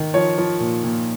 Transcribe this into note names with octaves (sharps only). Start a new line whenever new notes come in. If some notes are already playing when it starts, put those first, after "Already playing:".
Already playing: D#3
F3 C#5
F3
A#2
A#2